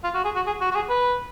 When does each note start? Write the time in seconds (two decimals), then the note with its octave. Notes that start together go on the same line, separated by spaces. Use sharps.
0.04 F4
0.15 F#4
0.24 G#4
0.36 F#4
0.47 G#4
0.61 F#4
0.71 F#4
0.75 G#4
0.89 B4